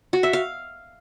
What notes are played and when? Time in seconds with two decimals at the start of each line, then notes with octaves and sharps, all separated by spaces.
0.13 F#4
0.23 E5
0.33 F5